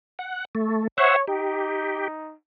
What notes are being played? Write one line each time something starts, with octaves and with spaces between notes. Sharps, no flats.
F#5
A3
C5 C#5 E5 F#5
D#4 G4